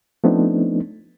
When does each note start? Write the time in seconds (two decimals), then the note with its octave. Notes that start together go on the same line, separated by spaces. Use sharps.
0.24 F3 A3 B3 C4 D4 D#4